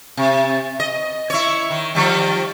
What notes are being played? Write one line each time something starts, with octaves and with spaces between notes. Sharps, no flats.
C3
D#5
E4 C#5
D#3
D#3 F3 G3